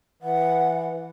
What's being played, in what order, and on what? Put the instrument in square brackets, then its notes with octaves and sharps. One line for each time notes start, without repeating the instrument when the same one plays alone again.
[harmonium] E3 [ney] F#5